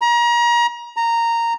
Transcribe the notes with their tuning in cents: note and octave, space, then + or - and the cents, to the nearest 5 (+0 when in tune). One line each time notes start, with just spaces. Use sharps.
A#5 +35
A#5 -10